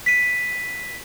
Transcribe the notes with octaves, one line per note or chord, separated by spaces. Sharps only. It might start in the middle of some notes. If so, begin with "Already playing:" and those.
B6 D#7